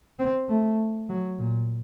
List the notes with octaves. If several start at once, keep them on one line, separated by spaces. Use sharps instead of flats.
C4
A3
F#3
A#2